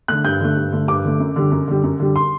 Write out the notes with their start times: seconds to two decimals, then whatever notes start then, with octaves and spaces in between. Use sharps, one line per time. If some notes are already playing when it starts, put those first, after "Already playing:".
0.08 D3 A3 F#6
0.24 G2 G6
0.40 D3 A3
0.56 G2
0.72 D3 A3
0.88 G2 D6
1.04 D3 A3
1.20 F#2
1.36 D3 G3
1.52 F#2
1.68 D3 G3
1.84 F#2
2.00 D3 G3
2.16 C6